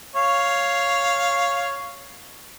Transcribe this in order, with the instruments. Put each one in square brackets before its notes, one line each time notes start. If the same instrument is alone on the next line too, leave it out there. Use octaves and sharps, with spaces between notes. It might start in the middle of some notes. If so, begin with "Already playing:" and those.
[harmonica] C#5 F5